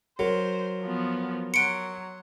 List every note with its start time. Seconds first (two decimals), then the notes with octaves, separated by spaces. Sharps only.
0.19 F#3 A#4 C5
0.81 F3 B3
1.54 F#3 F#5 C6 C#7 D7